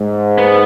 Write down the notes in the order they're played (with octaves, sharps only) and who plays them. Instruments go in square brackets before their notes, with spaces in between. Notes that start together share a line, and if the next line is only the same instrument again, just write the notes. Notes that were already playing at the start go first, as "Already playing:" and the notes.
Already playing: [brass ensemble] G#2
[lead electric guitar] B3